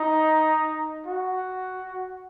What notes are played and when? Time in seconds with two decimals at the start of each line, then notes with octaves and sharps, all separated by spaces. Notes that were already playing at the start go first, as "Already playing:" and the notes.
Already playing: D#4
1.06 F#4